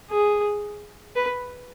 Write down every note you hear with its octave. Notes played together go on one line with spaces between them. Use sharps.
G#4
B4